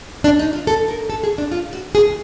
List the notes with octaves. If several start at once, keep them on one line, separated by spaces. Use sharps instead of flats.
D4
D#4
F4
A4
A#4
A4
G#4
D4
F4
F#4
G#4